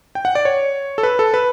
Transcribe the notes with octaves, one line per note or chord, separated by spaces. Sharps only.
G5
F#5
D5
C#5
A4
B4
A4
B4